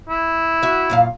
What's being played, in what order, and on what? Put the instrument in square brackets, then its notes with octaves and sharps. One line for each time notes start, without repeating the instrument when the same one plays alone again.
[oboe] E4
[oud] F#4 E5
F#2 A#2 F5